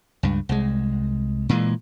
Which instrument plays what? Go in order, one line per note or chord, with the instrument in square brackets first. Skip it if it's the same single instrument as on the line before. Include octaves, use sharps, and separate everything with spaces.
[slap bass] C#2 G2
C2 G#3
A#2 E3 G#3